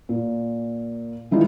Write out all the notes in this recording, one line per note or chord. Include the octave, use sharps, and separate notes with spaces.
A#2
D#3 E3 G#3 D#4 F4